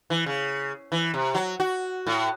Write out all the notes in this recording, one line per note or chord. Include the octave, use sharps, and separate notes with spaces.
E3
C#3
E3
C3
F#3
F#4
A2